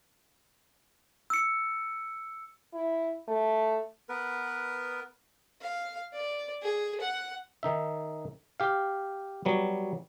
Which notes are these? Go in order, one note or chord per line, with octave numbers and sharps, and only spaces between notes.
E6 C#7
E4
A3
B3 A#4 B4
F5
D5
G#4
F#5
D#3 D#4 E5
G4 F5
F#3 G3 B3